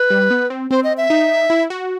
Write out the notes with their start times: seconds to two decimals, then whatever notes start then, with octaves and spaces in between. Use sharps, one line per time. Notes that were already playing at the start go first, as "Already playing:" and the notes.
Already playing: B4
0.10 G3
0.30 B3
0.50 C4
0.71 C4 C5
0.84 D#5
0.97 E5
1.10 D#4
1.50 E4
1.70 F#4